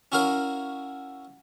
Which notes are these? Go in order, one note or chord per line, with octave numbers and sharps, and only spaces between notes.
C#4 E4 F#4 A#4 F5